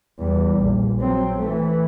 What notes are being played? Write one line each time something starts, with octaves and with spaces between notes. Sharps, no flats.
E2 G3
A#1
F#3 C4
E3 A3